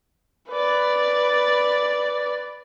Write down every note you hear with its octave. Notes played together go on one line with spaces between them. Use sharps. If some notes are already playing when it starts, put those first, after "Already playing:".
B4 D5